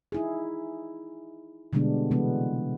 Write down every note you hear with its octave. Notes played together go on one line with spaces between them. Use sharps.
D#4 E4 G#4
B2 D3 G3 G#3 B3 D4
C3 E3 G#3 B3